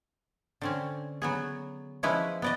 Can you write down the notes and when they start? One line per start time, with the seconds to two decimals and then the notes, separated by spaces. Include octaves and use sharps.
0.61 D3 C4 C#4
1.22 F#3 B3 G#4
2.03 F3 G#3 C#4 E4 G#4 B4
2.42 B3 D5 D#5